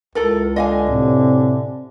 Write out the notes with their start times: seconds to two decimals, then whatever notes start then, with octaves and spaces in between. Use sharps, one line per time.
0.15 C#2 E4 A4 A#4
0.56 D3 D#5 F5 G#5
0.89 A2 C3